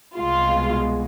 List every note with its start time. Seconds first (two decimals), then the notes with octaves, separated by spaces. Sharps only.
0.16 C2 B2 G#3 F4